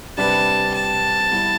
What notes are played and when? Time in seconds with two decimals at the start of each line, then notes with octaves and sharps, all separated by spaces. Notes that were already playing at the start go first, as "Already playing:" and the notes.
0.17 C3 G3 D4 G4 B4 A5
0.74 A5
1.31 G3 B3 E4